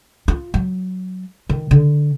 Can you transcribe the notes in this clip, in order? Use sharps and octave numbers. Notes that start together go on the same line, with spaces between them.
F4
F#3
D#3
D3